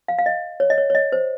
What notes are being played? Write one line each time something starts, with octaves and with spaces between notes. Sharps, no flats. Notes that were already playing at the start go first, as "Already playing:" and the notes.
F5
F5
D#5
C#5
D#5
C#5
C#5
D#5
C5